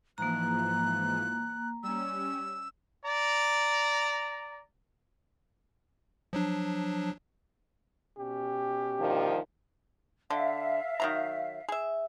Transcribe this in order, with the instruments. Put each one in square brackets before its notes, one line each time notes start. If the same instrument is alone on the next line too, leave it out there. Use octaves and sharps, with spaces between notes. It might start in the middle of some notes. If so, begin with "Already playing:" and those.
[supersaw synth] G#2 E3 F3 [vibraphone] A#3 A#5 [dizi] F#6
[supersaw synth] G3 C#4 [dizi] E6
[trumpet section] D5 A#5
[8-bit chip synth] F3 F#3 D4
[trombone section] B2 C#4 G4
[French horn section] D2 F3 [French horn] D#3
[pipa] D3 [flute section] E5 F5
[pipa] D#3 F#3 A#5
G#4 E5